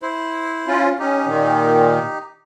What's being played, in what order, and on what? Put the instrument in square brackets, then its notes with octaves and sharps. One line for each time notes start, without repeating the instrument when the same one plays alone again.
[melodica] E4 C5
[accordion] C#4 F4
[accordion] C#4 [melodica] D#4 G4
[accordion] A#2 D#3